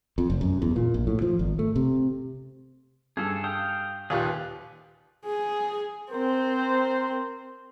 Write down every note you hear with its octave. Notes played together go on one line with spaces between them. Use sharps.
F2
F1
F#2
E2
A#2
A#1
A2
F3
G#1
A3
C3
G2 G#4 A4
F5 G5 D#6
D#2 A#2 G4 G#4 B4
G#4
C4 A#4 C5